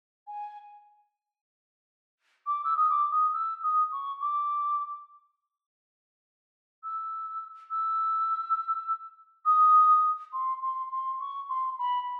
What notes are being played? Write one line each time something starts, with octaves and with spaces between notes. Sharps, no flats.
G#5
D6
E6
D#6
D6
D#6
E6
D#6
C#6
D6
E6
E6
D#6
C6
C6
C6
C#6
C6
B5